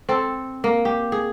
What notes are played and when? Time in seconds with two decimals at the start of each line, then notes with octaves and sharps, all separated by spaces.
0.09 C4 A4
0.64 A#3
0.85 G4
1.12 G#4